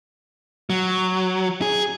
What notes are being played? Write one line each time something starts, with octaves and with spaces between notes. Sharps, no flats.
F#3
G#4